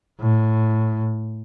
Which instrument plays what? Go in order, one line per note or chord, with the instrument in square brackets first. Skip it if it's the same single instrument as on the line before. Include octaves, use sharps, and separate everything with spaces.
[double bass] A2